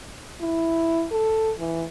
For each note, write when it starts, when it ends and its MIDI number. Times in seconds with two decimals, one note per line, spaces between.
0.41 1.06 64
1.12 1.52 69
1.59 1.85 52